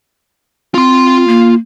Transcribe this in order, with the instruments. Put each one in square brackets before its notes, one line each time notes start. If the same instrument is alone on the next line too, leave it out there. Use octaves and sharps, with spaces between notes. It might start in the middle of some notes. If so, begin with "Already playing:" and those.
[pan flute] C4 [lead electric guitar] F4 C6
[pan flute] A#3